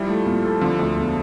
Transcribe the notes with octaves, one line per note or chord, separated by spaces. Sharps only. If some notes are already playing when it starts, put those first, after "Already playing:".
Already playing: F3 G3 E4
A3
A#2
A4
D3 F3
D2
E1